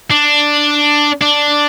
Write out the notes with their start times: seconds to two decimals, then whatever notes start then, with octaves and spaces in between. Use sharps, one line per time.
0.11 D4
1.22 D4